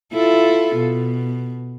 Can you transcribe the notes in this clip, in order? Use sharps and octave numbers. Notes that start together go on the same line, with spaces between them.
E4 F4 A4
B2